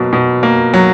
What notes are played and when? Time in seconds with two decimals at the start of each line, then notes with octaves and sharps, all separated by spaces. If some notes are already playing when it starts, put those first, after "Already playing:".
Already playing: B2 F#3 A#3
0.13 B2
0.43 A#3
0.74 F#3